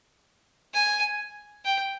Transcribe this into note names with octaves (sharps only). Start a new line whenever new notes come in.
G#5
G5